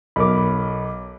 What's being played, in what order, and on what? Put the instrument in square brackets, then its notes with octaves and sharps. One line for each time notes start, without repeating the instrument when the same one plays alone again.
[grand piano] B1 A#4 [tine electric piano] B5 D6